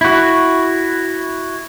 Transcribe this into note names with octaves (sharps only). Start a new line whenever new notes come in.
E4 F#4